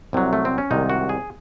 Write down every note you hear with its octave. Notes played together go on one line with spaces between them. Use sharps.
C2 C3 F#3
A3
C4
C#4
C2 C3 D#3 G#3 D#4
F#4
G#4